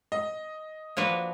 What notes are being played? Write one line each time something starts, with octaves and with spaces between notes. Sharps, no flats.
D#5
F3 A#3 D4 F#4 B4